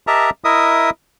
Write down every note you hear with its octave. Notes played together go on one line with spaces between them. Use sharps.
G4 A#4 D#5 E5 A5 A#5
E4 A#4 D#5 E5 D#6